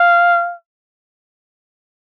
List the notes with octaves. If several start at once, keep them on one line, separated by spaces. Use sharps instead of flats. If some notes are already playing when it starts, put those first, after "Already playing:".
Already playing: F5